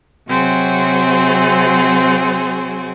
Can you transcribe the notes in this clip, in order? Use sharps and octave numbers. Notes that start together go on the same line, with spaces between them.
C3 F#3 C4 F#4 G#4